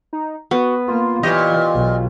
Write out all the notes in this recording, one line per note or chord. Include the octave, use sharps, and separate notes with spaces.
D#4
B3 F#4
A#3 F4
A#2 E3 G4 C#5 D#5
B1